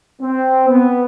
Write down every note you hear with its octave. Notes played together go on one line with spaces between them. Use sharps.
C4
B3